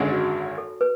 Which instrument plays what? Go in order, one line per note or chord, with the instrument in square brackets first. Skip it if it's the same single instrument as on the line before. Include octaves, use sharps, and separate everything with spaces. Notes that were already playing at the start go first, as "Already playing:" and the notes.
Already playing: [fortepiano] G#1 F#2 D3 G#3
[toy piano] F#4
A4
B4